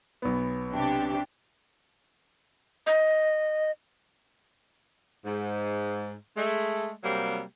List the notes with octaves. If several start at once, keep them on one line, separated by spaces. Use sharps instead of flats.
B1 B3
C3 D4 G4
D#5
G#2
G#3 A3
C3 F#3 G3 A#3